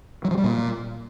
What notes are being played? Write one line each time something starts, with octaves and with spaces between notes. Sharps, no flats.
F#3
F3
G3
A#2